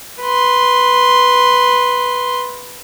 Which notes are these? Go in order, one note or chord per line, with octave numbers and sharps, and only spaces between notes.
B4 C6